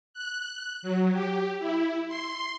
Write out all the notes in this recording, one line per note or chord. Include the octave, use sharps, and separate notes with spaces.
F#6
F#3
G4
E4
C6